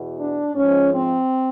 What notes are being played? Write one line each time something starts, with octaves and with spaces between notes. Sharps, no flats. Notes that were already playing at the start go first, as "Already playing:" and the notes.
Already playing: E2 B2
D4
G#2 F3 C#4
C4